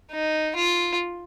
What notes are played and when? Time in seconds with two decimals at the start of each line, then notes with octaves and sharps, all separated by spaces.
0.12 D#4
0.56 F4